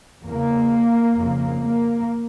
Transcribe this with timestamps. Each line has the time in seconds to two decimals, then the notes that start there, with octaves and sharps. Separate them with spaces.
0.25 E2 C#3 A#3
1.15 F2 C#3
1.61 A#3